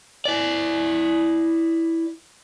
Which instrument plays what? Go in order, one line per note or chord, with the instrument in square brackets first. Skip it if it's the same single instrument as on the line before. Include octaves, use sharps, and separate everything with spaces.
[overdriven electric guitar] E4 D5